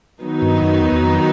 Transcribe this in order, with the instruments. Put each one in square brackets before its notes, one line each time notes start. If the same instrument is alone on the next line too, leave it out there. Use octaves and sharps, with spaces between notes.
[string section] D#3 F#3 B3 D#4
[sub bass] G2
F#2
E2
E2
F2